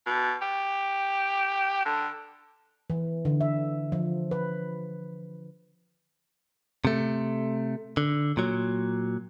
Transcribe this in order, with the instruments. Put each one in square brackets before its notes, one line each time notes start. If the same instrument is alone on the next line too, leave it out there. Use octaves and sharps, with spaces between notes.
[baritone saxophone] B2
G4
D3
[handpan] E3
D3
E5
F3
B4
[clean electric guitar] C3 A3
D3
A#2 F#3